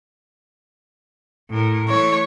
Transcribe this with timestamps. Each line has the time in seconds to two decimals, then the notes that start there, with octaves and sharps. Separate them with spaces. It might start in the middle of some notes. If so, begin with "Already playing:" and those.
1.50 A2 A#4
1.89 E3 A3 C#5